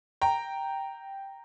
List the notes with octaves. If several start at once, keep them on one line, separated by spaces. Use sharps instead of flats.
G5 A#5